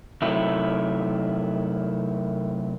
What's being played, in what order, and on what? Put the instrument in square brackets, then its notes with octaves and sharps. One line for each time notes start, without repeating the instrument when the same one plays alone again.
[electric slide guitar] C3 D#3 F#3 A3 E4